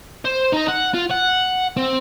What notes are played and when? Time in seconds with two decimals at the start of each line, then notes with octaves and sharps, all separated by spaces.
0.25 C5
0.52 D#4 A#5
0.68 F#5
0.94 F4
1.11 F#5
1.77 C4